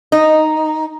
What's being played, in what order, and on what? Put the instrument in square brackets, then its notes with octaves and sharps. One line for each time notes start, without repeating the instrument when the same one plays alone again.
[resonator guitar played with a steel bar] D#4